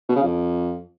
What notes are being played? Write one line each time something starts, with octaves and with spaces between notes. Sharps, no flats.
B2
C#3
F2